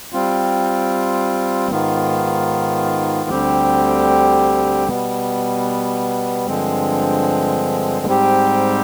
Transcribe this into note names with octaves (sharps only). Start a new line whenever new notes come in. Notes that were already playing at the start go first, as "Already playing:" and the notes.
G3 C4 F4
G#2 D#3 B3 F4
D2 D3 G3 C4 G4
B2 G3 B3
G2 D3 F3 G#3 C4
G#2 G3 C4 G4